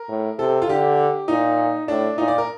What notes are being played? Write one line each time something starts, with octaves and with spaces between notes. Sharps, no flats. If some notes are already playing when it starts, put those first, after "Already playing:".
Already playing: A#4
A2
C3 A4
F4
D3 G4
A#2 D#4
A2 D4
A#2 D#4
D5
A#4